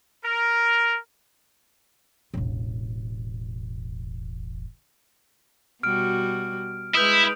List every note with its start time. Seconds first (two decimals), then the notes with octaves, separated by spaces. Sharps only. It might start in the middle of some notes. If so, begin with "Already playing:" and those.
0.25 A#4
2.34 E1 A1
5.83 B2 G3 F#4 F6 D7
6.95 G#3 E4 B4 D#6 G6 F7